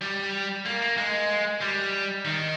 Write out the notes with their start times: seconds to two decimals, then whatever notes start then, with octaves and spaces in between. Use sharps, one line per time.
0.02 G3
0.66 A#3
0.82 A#3
0.98 G#3
1.61 G3
2.25 D#3